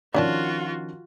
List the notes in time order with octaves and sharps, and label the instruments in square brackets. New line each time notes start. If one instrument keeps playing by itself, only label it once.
[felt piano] D#3 F3 [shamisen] C#4 D4 A5 [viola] F4 F#4